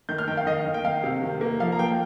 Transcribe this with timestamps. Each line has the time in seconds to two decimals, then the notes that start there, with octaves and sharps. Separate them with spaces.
0.09 D#3 G6
0.18 F6
0.28 D#3 G5
0.37 F5
0.47 D#3 D#5
0.65 D#3
0.74 G5
0.84 D#3 F5
1.03 C3
1.22 D#3
1.41 A#3
1.60 F3 F5
1.72 A#5
1.79 A#3 G5